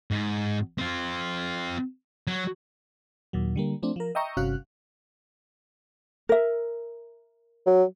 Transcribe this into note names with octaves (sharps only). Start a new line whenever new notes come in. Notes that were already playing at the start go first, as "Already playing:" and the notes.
G#2
C4 F4
F#3
D#2 A#2 F#3
D3 G3 A#3
F3 A3 C4 D4
F3 A#4
D#5 E5 G5 A#5 C#6 D#6
G1 C3 C#4 F#4 F5 F#6
A#4 E5
F#3